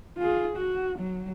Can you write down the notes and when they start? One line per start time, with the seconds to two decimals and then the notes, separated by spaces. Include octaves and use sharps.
0.18 F4 G#4
0.56 F#4
0.98 F#3